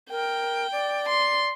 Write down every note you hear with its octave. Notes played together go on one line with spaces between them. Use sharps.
A#4 G5
D5
C6